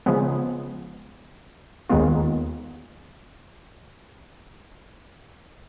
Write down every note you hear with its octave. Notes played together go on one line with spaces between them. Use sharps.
C#3 F3 G#3 B3
D#2 D#3 G#3 B3 F4